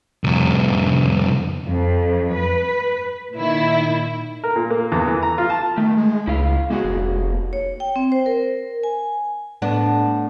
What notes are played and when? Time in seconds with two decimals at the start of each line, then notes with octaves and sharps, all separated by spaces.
0.24 C2 F2
1.68 F2
2.35 B4
3.35 A#2 D#3 E4
4.44 A#4
4.56 A#2
4.70 A#3
4.92 E2
5.07 E3
5.23 A#5
5.38 F4
5.50 A5
5.77 D#3 A3
5.97 G#3
6.27 C#2 E4 F5
6.70 G#3 A#3 F#4 G#4
6.85 F1
7.53 C#5
7.80 G5
7.96 C4
8.12 C5
8.26 A#4
8.83 G#5
9.62 A2 B3 D4